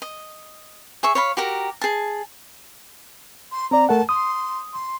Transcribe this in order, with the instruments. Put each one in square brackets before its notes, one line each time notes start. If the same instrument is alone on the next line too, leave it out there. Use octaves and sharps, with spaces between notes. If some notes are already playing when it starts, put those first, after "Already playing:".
[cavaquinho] D#5
G#4 E5 C#6
C#5 F5 B5
F#4 G4 A#4 A#5
G#4 A5
[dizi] C6
[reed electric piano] C4 D5 [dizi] A#5
[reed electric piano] A3 A#4 F#5 [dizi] A5
[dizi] C6 [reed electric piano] D#6
[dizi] C6